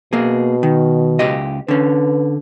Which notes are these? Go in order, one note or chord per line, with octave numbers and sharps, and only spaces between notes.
B2 A#3 G#4
D#3
C#2 G4 D#5
D3 C#4 B4